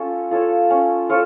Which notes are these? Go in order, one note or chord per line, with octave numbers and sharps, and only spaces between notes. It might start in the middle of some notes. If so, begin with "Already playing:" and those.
Already playing: C#4 F4 A4 C#5
F4 A4 C#5
C#4
F4 A4 C#5